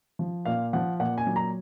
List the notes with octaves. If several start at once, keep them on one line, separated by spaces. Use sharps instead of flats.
F3
A#2 F5
F3 F#5
A#2 F#5
G#5
F#3
A#5